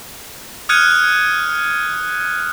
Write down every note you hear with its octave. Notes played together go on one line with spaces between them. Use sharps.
D#6 F6 F#6 G#6 C#7 D#7